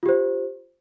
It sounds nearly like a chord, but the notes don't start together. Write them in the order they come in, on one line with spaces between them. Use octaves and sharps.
F4 G4 C5